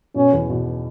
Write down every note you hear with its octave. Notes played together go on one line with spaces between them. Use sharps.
B2 C#4
E2
B2